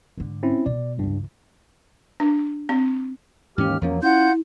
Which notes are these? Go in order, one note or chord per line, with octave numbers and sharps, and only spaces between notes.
G#2 D3
C4 C#4 E4
B2 D5
C#2 G2 E3
D4
C4
D#2 G#2 E3 C#4 G4 F6
E2 F3 F#3 A#3 C#4
C#4 E4 F4 F#5 G6